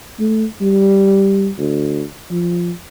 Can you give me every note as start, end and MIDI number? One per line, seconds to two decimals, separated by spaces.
0.19 0.45 57
0.61 1.50 55
1.58 2.03 38
2.30 2.72 53